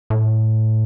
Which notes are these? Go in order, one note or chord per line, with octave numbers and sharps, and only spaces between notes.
A2